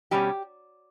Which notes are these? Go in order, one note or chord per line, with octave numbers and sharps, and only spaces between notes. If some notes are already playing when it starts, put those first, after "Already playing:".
B2 G3 C#4 G4